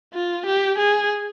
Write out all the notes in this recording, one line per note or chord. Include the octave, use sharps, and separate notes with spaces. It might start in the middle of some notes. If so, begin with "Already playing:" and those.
F4
G4
G#4